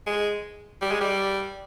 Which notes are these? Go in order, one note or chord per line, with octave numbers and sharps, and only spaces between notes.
G#3
G3
G#3
G3